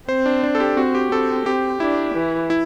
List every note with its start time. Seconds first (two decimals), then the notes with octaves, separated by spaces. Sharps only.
0.08 C4 C5
0.26 D4
0.43 D4
0.55 A4
0.60 G4
0.77 C4 F#4
0.95 G4
1.12 C4 A4
1.46 C4 G4
1.80 D4 E4
2.15 E3
2.50 E4